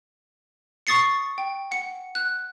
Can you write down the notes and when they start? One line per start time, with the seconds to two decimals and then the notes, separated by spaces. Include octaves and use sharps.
0.87 C#6 D#6 A6 C7 C#7
1.38 G5
1.71 F#5 C#7
2.15 F#6